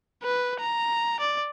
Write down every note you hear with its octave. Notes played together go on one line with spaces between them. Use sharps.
B4
A#5
D5